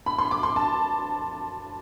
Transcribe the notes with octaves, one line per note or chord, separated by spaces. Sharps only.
B5
C6
D6
C6
A5